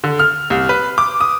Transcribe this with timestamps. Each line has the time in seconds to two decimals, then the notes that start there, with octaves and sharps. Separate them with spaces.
0.04 D3
0.19 F6
0.50 C2
0.69 B4
0.98 D6
1.21 D#6